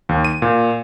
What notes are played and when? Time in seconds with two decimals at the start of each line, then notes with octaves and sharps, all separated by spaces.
0.09 D#2
0.25 D#7
0.42 A#2